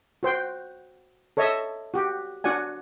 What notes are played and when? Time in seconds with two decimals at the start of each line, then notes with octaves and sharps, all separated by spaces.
0.23 F#4 C5 G5
1.37 A4 C#5 D#5 E5
1.94 F#4 G4
2.44 D4 F#4 D5 F#5 G#5